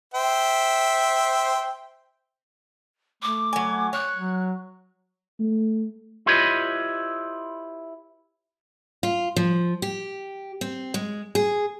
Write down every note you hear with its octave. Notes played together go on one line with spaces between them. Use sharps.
C5 E5 G5
A3 D6
F#3 G#5
C#5 F#6
F#3
A3
E4 F4 G4 B4 C#5 D#5
F4
F3
G4
C4
G#3
G#4